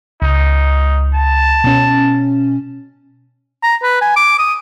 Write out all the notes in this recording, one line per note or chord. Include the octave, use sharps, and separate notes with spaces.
C#2 D#4
A5
B2 C#4
A#5
B4
G#5
D6
D#6